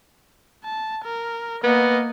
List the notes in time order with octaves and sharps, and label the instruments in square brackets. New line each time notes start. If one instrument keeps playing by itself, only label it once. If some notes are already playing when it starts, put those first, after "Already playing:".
[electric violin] A5
A#4
[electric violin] A#3 D#5 [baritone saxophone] B3